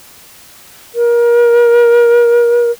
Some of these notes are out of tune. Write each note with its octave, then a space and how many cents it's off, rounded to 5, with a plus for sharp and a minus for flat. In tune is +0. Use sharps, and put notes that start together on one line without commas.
A#4 +30